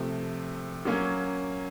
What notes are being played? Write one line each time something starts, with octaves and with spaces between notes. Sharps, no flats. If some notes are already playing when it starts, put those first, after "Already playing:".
Already playing: C3 F3 A3
F#3 A#3 C#4